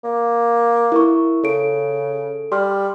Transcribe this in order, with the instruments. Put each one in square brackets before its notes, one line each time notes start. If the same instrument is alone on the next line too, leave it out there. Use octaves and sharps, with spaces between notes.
[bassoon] A#3
[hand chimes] E4 A#4 C#6
[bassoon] C#3 [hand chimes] A4 D7
[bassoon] G3 [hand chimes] C6 F6